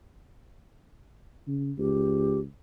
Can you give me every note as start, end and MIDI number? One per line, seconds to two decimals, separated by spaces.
1.47 1.72 49
1.78 2.45 37
1.78 2.40 67